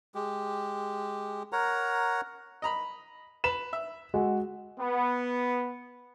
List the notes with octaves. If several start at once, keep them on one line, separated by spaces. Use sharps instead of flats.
G#3 G4
A#4 C#5 F#5 A#5
D#5 A#5 B5
B4 E7
E5
G#3 F#4
B3